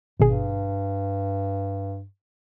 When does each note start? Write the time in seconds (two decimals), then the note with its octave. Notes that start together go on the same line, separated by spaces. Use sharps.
0.20 G#1 G2 B2 G#4